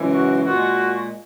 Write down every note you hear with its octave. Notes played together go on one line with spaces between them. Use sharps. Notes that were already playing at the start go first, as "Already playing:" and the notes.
Already playing: F#2 C#3 E3 G#3
F#4
A#2 G#3 F#4